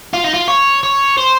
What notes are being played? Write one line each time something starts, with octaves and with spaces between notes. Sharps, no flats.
F4
D#4
F4
C#5
C#5
C5